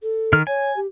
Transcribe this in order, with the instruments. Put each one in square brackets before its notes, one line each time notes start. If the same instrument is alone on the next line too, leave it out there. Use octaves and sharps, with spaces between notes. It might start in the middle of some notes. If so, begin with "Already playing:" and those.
[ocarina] A4
[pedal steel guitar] D#3 F6
[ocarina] C#5 [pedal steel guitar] G#5
[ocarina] G4